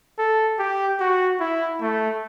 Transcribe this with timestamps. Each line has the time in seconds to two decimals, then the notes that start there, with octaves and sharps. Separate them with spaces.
0.18 A4
0.59 G4
1.00 F#4
1.40 E4
1.81 A3